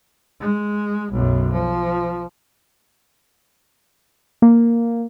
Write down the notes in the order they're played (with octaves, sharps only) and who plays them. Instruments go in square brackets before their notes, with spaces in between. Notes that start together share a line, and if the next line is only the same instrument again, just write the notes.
[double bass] G#3
B1 F#2
F3
[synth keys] A#3